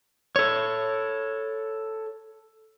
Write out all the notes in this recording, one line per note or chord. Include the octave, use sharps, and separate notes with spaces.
A4 C#5